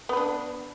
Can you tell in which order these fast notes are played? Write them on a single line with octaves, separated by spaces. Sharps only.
B3 B4 D4